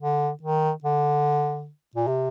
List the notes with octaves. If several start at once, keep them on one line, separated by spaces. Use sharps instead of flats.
D3
D#3
D3
A#2
C3